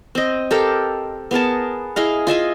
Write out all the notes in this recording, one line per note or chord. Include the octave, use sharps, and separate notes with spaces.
C4 D#5
G4 A4 A#4 F5
B3 G#4 A#4 A5
E4 G#4 D#5 F5
F4 D#5 E5 G#5